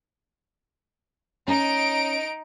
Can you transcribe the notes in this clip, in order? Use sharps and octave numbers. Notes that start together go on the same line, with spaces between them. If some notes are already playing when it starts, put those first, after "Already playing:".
C#4 D#4 D7